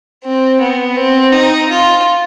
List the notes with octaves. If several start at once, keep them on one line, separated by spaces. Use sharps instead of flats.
C4
B3
C4
D#4
F4